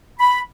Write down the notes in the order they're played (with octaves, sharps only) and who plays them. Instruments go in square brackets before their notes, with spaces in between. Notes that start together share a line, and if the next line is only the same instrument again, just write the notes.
[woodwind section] B5